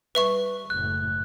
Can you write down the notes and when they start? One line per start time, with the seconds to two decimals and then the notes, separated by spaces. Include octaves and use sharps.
0.15 G3 B4 E5 C#6
0.70 F#1 A2 F#6